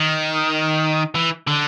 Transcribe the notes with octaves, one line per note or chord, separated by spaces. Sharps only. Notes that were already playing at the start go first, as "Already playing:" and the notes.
Already playing: D#3
E3
D3